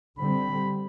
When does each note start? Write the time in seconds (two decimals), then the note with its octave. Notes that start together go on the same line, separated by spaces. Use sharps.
0.19 D3 G3 C4 B5